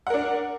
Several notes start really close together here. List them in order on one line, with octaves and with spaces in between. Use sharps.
F#5 A#4 D4